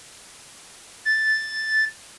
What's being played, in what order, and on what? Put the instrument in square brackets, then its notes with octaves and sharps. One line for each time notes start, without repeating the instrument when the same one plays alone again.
[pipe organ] A6